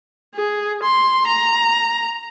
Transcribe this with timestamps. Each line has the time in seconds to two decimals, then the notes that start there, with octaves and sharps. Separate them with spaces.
0.35 G#4
0.83 C6
1.27 A#5